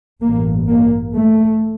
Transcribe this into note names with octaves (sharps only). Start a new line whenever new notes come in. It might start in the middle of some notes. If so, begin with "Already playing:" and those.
A1 G2 A#3
A#3
A3